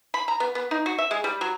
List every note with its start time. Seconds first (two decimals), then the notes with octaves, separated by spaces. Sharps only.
0.14 B5
0.28 A#5
0.40 B3
0.55 B3
0.71 D#4
0.86 F#4
0.98 E5
1.11 G#3
1.24 G3
1.41 F#3